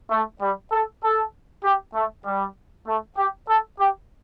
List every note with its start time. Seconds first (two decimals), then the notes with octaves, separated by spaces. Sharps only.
0.11 A3
0.42 G3
0.72 A4
1.03 A4
1.64 G4
1.95 A3
2.26 G3
2.88 A3
3.18 G4
3.49 A4
3.79 G4